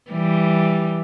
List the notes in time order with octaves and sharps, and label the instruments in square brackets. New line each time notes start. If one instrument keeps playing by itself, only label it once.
[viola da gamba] E3 G3